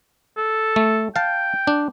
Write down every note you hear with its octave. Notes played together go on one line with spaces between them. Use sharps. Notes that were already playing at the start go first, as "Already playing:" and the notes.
A4
A3
F5 G5 A5
D4